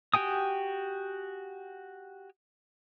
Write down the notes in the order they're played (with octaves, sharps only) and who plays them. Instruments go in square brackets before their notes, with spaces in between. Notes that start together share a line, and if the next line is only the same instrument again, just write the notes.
[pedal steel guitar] F#4 G4 G5 G#5 D#6